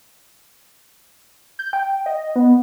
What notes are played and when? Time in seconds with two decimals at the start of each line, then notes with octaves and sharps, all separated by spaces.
1.59 G6
1.73 G5
2.06 D#5
2.36 B3